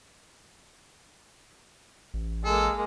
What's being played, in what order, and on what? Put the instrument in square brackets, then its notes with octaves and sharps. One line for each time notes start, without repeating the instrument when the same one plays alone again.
[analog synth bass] A1
[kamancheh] G#3 A#3 [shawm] A4